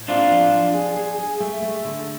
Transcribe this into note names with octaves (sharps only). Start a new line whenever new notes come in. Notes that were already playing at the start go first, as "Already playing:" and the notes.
Already playing: A2
C4 D4 F4
F3
F3
G#4
G#4
G#4
A3
A3
D3